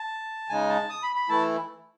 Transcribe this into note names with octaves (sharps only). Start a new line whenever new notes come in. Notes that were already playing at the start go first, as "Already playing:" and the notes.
Already playing: A5
C#3 G#3 D#4 G#5
A5
D#6
B5
B5
E3 A3 E4 A5